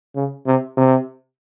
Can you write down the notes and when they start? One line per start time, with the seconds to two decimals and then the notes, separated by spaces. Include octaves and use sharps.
0.15 C#3
0.47 C3
0.77 C3